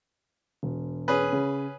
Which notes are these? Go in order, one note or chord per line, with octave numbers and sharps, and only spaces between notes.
E1
C#4 G#4 B4
C#3